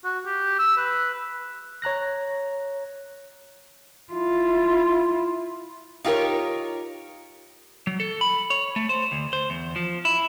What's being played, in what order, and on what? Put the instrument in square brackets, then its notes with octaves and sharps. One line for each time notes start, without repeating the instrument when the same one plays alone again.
[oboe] F#4
G4
E6
B4
[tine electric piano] C#5 A#5 F#6 A#6
[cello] E4 F4
[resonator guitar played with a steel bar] D#4 F4 G4 G#4 A#4 C#5
[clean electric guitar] F#3
A4
B5
C#5
A3
C5
D2
C5
E2
F3
E4